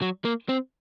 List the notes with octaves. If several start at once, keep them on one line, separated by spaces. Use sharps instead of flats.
F#3
A#3
C4